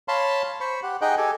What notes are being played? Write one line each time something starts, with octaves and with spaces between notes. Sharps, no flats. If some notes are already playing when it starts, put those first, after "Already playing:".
C#5 F5 A5 B5 C6
C5 B5 C#6
G4 F#5
D#4 G#4 D#5 F#5 G5
G4 A4 G#5